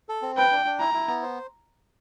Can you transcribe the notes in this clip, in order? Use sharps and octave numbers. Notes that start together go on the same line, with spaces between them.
A4
C4
B4 G5
D4
D4
E4 A#5
E4
B3
C5